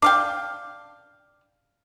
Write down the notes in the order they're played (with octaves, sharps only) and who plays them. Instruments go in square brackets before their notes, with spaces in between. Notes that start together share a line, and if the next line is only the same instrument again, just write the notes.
[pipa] D4 F5 G5 [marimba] D6